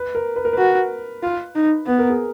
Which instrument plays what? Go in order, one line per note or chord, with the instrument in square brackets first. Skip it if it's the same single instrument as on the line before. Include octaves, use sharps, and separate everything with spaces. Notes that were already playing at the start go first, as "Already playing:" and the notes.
Already playing: [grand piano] B4
A#4
B4
A#4
[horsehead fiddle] F#4 [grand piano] B4
[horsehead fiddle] F4
D#4
[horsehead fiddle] B3 [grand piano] B4
[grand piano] A#4
G#4